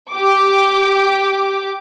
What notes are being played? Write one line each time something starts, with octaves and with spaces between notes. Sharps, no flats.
G4 D6